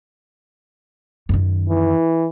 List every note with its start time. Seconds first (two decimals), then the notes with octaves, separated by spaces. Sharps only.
1.29 F#2 D#3
1.69 E3